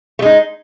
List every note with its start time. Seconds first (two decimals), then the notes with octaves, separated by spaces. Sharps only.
0.19 A3
0.22 G#3
0.25 D#4